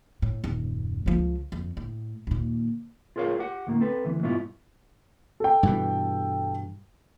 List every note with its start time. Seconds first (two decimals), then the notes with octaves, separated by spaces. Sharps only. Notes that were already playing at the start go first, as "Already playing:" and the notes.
0.22 A2
0.44 D#1 F#2
1.06 C#2 F3
1.52 F2
1.77 A2
2.27 D#2 A#2
3.16 F4 G#4 A#4 C#5 F5
3.39 G4 F#5
3.67 D2 A2 A#3
3.80 C4 A4 B4
4.05 D2 E3
4.22 G#2 B2 G3 E4 F4
5.40 A4 G5
5.63 G2 B2 E3